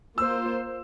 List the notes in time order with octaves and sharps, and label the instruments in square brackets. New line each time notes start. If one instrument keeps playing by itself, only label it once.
[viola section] A#3 F4 C5 [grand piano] E6